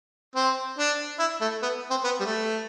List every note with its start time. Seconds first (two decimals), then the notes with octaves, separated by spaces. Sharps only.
0.35 C4
0.78 D4
1.19 E4
1.41 A3
1.62 B3
1.90 C4
2.04 B3
2.20 G3
2.25 A3